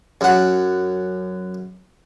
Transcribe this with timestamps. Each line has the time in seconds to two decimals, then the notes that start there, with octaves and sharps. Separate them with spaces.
0.21 F#2 F#5